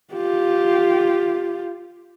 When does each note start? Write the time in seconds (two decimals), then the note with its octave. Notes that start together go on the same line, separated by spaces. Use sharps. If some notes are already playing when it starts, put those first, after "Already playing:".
0.13 F4 G4